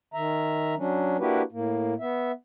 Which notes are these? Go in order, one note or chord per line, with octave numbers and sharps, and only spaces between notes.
D#3 E5 A#5
F#3 C#4 D4
A#3 D4 E4 F#4 G4 B4
A2 A#3
B3 E5